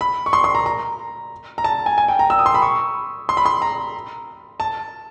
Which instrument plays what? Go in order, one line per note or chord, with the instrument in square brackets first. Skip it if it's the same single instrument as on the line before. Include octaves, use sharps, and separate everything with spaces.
[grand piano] B5
C#6
C6
C6
A#5
A#5
A#5
A5
G#5
G#5
G5
A#5
E6
D#6
C6
B5
C#6
C6
B5
C6
A#5
A5